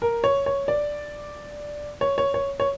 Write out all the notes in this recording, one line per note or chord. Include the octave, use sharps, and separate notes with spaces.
A#4
C#5
C#5
D5
C#5
C#5
C#5
C#5